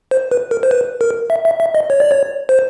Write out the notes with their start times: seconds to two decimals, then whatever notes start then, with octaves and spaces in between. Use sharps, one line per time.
0.11 C5
0.31 B4
0.51 A#4
0.63 C5
0.71 B4
1.01 A#4
1.30 E5
1.45 E5
1.60 E5
1.75 D#5
1.90 C#5
2.00 D5
2.11 C#5
2.49 C5